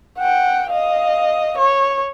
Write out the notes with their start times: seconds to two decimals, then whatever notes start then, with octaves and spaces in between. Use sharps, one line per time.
0.19 F#5 G5
0.70 D#5 F5
1.58 C#5